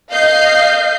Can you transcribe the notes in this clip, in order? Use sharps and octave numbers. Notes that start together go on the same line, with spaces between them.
D#5 F5 G6 C7